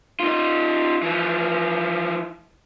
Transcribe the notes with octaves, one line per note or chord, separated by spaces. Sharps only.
D#4 F4
E3 F3